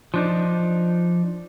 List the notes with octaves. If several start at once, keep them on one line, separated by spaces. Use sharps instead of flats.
F3 D4 D#4